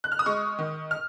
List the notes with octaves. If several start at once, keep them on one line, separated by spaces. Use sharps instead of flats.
F#6
F6
D#6
G#3 C#6
D#3
F6